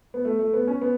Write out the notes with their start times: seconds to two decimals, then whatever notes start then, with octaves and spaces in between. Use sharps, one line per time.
0.14 B3
0.25 A3
0.39 A3
0.53 B3
0.67 C#4
0.82 B3